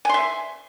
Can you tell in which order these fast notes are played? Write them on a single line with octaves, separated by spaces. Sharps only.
G#5 C6 E5